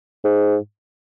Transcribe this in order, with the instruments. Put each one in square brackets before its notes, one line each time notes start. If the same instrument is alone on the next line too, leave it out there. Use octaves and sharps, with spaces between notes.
[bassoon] G#2